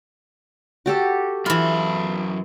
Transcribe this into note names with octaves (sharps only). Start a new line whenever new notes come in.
F#4 G4 A4
F#2 E3 F4 B5